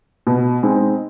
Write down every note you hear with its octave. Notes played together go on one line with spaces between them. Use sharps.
B2
G#3 C4 D#4